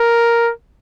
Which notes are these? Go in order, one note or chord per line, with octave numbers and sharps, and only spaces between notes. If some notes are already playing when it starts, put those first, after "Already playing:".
Already playing: A#4